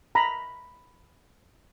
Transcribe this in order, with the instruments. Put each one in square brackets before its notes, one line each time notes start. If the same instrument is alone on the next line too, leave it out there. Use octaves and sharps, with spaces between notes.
[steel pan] A#5 B5